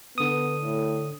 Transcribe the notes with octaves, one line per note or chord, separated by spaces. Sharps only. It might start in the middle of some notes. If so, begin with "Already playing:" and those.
D3 B3 D#6
A2